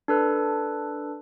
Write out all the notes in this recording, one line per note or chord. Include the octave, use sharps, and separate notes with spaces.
D4 A4 B4